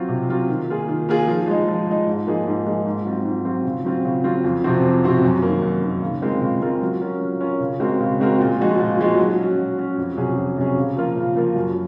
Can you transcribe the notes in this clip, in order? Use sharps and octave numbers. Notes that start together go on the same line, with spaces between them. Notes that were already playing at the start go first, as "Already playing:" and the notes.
Already playing: F#3 C4 F4
C3
F#3 C4 F4
D#3
A#3 F4 G#4
D#3
A#3 F4 G#4
F3
G#3 D#4
F3
G#3 D#4
G#2
F3 A#3 D#4 G#4
G#2
F3 A#3 D#4 G#4
G#2
F#3 C4 F4
G#2
F#3 C4 F4
C#3
F#3 C4 F4
C#3
F#3 C4 F4
F2
C3 F3 C4 F#4
F2
C3 F3 C4 F#4
F#2
D#3 A#3
F#2
D#3 A#3
C#3
G#3 C4 F4 A#4
C#3
G#3 C4 F4 A#4
F#3
C#4 F4 A#4
F#3
C#4 F4 A#4
C#3
G#3 C4 F#4 A#4
C#3
G#3 C4 F#4 A#4
A#2
F3 G#3 D#4 F#4
A#2
F3 G#3 D#4 F#4
F#3
C#4 F#4
F#3
C#4 F#4
F2
C3 F#3 C#4 G#4
F2
C3 F#3 C#4 G#4
C#3
F3 A#3 F4 A#4
C#3
F3 A#3 F4 A#4
F#2